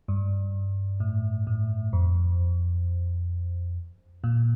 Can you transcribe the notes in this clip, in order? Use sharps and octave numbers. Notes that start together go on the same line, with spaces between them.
G2
A2
A2
F2
A#2